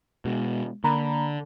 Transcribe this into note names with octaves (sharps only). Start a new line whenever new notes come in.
B2 G#3
D3 A#3 A#5 B5